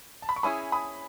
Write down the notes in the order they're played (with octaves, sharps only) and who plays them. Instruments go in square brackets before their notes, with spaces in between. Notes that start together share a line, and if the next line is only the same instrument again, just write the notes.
[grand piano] A5
B5
C#6
[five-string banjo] C#4 E4 G#4 [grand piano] B5 D#6
[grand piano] B5 D#6